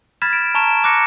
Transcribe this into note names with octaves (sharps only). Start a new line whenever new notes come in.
B5 F6 G#6 A6 B6 E7
D7
A5 A#5 C#6 F6 D7 E7
D6 F#6 A#6 C#7